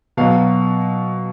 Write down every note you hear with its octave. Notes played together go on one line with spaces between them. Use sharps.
B2 F#3 F5